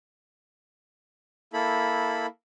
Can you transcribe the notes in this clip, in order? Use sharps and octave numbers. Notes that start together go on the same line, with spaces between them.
A#3 E4 A4 B5